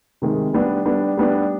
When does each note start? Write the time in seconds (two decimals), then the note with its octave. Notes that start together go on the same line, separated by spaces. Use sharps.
0.22 C3 D#3 G#3
0.53 G3 B3 D4
0.86 G3 B3 D4
1.17 G3 B3 D4